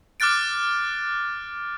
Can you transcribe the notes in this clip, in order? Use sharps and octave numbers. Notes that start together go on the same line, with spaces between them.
D6 F6 F#6 A6 D7